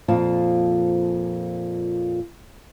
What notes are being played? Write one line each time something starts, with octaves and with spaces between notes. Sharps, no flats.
F2 A#2 F3 C5 F5 A5